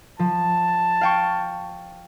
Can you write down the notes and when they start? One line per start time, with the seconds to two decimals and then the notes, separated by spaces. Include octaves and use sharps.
0.19 F3 A5
1.01 F5 G5 C#6